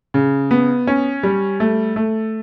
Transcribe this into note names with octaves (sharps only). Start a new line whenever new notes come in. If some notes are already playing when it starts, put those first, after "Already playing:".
C#3
B3
C#4
G3
A3
A3